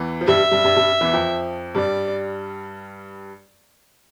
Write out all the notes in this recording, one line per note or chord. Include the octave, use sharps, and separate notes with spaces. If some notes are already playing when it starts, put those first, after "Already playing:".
Already playing: E2 E3
F3
G2 G3 E5
G2 G3
G2 G3
G2 G3
E2 E3
F2 F3
G2 G3 D5